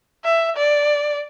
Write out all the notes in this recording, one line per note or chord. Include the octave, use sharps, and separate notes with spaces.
E5
D5